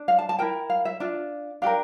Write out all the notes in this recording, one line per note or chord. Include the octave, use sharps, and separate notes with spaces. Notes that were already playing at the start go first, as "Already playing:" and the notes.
Already playing: D4
F5
A5
A5
E4 A#4 G5
F5
E5
D4 F4
D4 G4 A#4 F5